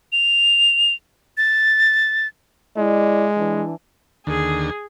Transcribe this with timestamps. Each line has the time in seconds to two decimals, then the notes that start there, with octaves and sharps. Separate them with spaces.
0.12 F7
1.37 A6
2.77 G#3 E4 D5 D#5
3.37 E3 D4
4.27 D#2 D3 G#4